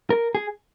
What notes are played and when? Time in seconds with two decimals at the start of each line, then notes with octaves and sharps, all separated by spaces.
0.10 A#4
0.35 G#4